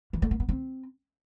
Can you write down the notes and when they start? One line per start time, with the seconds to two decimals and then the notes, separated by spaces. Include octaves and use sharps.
0.13 E3
0.22 A3
0.31 A#3
0.40 B3
0.49 C4